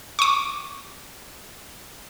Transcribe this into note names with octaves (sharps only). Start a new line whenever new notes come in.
C#6 D6